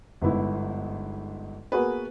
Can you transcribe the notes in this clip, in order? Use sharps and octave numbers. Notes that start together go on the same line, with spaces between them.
G1 G#2 B3 E4
A#3 B3 F#4 G#4 B4